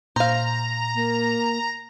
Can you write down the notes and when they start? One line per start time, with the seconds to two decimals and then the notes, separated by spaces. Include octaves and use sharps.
0.16 A#2 C5 F5 A#5
0.95 A#3